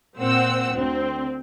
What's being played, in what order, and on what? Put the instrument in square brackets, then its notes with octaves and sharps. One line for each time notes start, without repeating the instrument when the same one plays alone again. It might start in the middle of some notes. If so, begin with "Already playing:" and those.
[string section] A#2 C4 F#5 E6
D2 C4